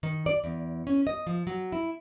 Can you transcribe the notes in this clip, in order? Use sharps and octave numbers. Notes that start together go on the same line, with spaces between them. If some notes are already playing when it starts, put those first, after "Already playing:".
D#3
D5
E2
C#4
D#5
F3
F#3
E4